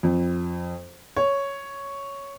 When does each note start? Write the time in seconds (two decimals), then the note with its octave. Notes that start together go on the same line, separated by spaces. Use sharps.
0.03 F2
1.16 C#5